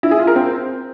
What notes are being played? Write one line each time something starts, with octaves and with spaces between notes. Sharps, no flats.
E4
G#4
F4
A#4
C4